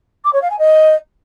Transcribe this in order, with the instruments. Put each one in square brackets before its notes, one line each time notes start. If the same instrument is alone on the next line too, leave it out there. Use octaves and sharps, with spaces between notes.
[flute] D6
C#5
F5
G#5
D#5